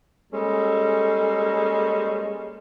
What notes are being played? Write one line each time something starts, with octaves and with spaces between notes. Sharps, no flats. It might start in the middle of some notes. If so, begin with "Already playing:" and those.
G3 G#3 A#3 C#4 A4